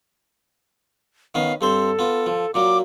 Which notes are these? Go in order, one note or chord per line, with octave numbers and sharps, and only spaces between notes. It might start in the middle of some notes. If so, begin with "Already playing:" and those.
D#3 B3 C#4 F5
G2 C4 A4 C5
B3 F4
F3
A#2 F#3 A#3 D6